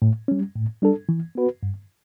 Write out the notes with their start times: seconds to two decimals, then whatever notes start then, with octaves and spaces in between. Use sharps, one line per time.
0.02 A2
0.28 G3 C#4
0.55 A2
0.82 G3 D4 A4
1.09 E3
1.35 B3 F#4 B4
1.63 G2